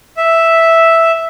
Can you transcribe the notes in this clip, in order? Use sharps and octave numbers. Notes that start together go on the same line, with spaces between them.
E5